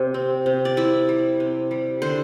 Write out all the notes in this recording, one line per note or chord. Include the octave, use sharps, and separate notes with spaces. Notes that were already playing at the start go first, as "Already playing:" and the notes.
Already playing: C3 G4
C4
C3
D5
C3 E4 E5
G3
C3
G3
D3 C5